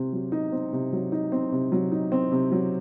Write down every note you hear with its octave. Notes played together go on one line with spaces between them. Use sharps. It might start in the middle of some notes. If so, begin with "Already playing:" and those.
Already playing: C3 C4
F#3
D#4
C4
C3
F#3
D#4
C4
C3
F#3
D#4
C4
C3
F#3